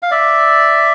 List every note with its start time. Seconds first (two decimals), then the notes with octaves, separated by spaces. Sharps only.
0.03 F5
0.11 D5 E5